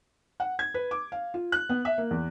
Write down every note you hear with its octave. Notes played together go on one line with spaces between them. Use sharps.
F#5
G#6
B4
D6
F5
F4
F#6
B3
E5
A#3
E2